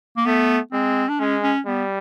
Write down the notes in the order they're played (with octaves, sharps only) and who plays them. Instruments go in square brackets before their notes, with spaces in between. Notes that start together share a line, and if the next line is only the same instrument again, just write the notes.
[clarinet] A#3
[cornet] A3 [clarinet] B3
[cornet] G#3 [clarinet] C4
[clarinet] D4
[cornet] G#3 [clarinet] C#4
[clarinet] C#4
[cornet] G3 [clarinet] B3